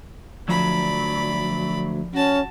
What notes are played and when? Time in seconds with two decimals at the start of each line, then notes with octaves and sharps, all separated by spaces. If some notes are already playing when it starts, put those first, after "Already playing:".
0.48 D2 F3 F#3 D5 B5
2.13 C#4 F#4 A5